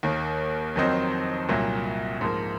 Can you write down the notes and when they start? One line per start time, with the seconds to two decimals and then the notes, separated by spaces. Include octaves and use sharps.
0.03 D#2 D#3 A#3
0.76 F2 D#3 F#3 C4 D#4
1.49 C2 A#2 F#3
2.21 G#2 F3 A#3